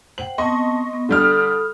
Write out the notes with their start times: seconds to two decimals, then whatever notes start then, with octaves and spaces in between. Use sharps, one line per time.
0.18 C5 F#5 G5 F#7
0.38 B3 C4 D#5 A5 C6 C#6
0.93 B3
1.09 D3 G3 A4 B5 D#6 F6